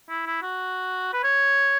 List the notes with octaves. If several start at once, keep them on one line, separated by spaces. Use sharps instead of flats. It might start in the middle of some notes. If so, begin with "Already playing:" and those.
E4
E4
F#4
B4
C#5